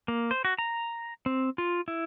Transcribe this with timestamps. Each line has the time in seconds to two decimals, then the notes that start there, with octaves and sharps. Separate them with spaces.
0.08 A#3
0.31 C5
0.45 F#4
0.59 A#5
1.26 C4
1.58 F4
1.88 E4